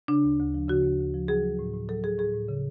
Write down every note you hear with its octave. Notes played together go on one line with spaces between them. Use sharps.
C#3 D4
D2
D2
F3
C#3 F#4
D2
D2
F3
F#3 G#4
F#3
A2
A2
F#3 A4
F#3 G#4
A2 G#4
A2
C#3